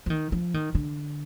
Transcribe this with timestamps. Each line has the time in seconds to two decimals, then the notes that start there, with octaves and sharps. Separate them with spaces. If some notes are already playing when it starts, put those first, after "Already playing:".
0.06 F3
0.10 D#3
0.32 F3
0.54 D#3
0.75 D3